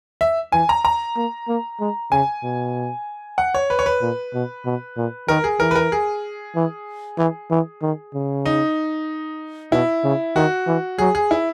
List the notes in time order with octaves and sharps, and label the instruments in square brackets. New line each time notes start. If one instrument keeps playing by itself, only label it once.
[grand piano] E5
[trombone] E3 [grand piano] G#5
[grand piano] A#5
A#5
[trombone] A#3
A#3
G#3
[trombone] C#3 [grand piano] G#5
[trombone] B2
[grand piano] F#5
C#5
B4
C#5
B4
[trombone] A#2
B2
B2
A#2
[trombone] D#3 [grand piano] A#4
[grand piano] G#4
[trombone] E3 [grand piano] A#4
[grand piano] B4
A#4
G#4
[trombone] E3
E3
E3
D#3
C#3
[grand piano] D#4
[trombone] B2 [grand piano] E4
[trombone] C#3
[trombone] D#3 [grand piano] F#4
[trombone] E3
[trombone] F#3 [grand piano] G#4
[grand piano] G#4
E4